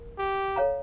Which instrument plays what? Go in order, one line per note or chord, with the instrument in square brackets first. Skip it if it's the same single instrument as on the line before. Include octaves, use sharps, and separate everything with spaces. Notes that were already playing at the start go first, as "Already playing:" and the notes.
Already playing: [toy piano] A#4
[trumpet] G4
[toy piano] A4 C#5 F5 A#5